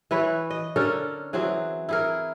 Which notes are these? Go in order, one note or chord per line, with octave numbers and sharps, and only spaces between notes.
E3 E4 B4 C#5
D#5
D3 C#4 A4 A#4
E3 F#3 C4 G#4
E4 G#4 A#4